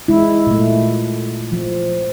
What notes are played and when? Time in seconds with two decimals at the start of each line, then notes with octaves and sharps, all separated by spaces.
0.08 G#3 E4
0.47 A#2 A3
1.52 F3